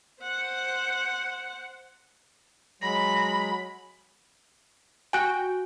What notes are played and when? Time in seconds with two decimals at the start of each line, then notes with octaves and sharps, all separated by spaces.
0.23 C5 F#5
2.82 F#3 G#3 B5 A#6
5.13 F#4 G5 G#5 F#6